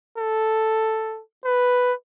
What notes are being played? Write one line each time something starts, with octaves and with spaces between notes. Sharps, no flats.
A4
B4